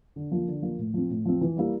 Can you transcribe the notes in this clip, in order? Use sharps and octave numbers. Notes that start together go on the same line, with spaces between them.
D3
F3 A#3
D3
F3 A#3
A2
F3 C4
A2
F3 C4
E3
G3 A#3 E4